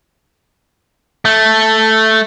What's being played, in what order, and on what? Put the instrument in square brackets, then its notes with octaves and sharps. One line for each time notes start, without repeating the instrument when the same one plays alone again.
[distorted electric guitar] A3